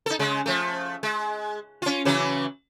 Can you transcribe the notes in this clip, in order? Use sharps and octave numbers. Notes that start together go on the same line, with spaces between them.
D#4 A4
C#3 G#3
F3 A3
G#3
C#4 F4
C#3 E3 F#3